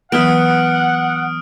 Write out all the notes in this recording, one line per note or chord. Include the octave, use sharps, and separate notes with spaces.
E3 F#3 B3 B4 F#5 D#6 F6 D7